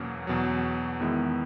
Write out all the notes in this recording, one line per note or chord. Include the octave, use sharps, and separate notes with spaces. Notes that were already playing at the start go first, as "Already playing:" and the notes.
Already playing: E2 B2 F#3 A#3 C#4
E2 B2 F#3
E2 D#3 G#3 B3 E4